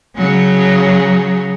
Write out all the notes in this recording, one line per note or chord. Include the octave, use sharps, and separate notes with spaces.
C#3 F#3